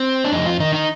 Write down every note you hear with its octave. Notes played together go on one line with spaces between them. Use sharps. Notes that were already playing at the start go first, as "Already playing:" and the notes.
Already playing: C4
D4
F2 D#4
F4
D#3 D#4
D#4